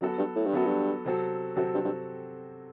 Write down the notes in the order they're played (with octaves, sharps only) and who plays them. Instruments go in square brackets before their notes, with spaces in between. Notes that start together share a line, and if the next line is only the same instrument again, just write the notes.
[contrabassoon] F#2 [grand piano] F#3 B3 F#4 A4
[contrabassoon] G2
A2
G2
[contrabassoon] F#2 [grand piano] F#3 B3 F#4 A4
[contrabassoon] G2
[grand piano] C3 F#3 C4 F#4 A4
[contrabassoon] F#2 [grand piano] C3 F#3 C4 F#4 A4
[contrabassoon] G2
G2